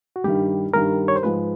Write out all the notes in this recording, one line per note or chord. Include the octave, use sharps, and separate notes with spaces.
F#4
G2 D#3 G3 G4
G2 D#3 G3 A#4
C#5
C5
G#2 F3 G#3 B4